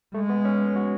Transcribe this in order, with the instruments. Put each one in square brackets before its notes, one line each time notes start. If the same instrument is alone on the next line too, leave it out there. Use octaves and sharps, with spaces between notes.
[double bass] G#3 [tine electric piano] A3
[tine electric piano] B3
C#4
F#4